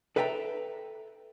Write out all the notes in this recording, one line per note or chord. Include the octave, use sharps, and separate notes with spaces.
A4 B4 E5 G5 G#5 A#5